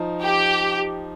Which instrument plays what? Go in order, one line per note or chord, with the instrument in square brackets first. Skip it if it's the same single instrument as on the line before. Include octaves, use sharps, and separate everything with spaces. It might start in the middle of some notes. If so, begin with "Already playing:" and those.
Already playing: [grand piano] F3 D#4
[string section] G4